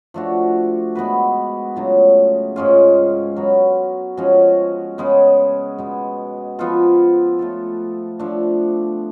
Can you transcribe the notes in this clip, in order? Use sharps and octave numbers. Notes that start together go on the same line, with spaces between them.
F3 A3 D4 F#4
G#3 B3 F#4 B4
C#3 F#3 A3 F4
G#2 G#3 C#4 F4
F#3 B3 F#4
F3 G#3 C#4 F#4
C#3 G#3 B3
B2 G#3 B3
F3 B3 F4 A4
A3 F4 A4
F3 A3 D4